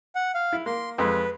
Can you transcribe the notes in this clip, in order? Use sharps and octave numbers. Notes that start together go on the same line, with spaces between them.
F#5
F5
E4
A#3 C6
F2 G#3 B4